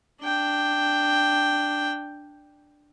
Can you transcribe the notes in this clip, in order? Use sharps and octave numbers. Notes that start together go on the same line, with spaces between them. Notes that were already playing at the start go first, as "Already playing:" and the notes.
D4 G5